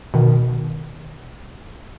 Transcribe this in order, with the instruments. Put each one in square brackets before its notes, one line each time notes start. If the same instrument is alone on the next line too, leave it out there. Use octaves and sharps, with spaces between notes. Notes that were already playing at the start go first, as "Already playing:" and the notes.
[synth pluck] B2 D#3